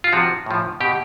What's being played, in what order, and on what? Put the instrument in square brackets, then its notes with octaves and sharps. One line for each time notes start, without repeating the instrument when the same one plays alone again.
[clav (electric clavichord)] F4
C3 F3 F#4
A2 F3
B2 G4